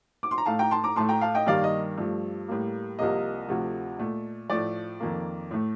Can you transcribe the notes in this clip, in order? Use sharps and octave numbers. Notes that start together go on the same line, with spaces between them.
D6
C6
A#5
A2 A3 F5 A5
G5 A#5
A5 C6
A#5 D6
A2 A3 A5 C6
G5 A#5
F5 A5
D#5 G5
G2 D#3 G3 A#3 D5 F5
D#5
G2 F3 A3
A2 G3 A#3
C2 C3 F3 A#3 D#5
D2 C3 F3 A3
A#2 A3
A2 F3 A3 D5
F2 D#3 A#3
A2 A3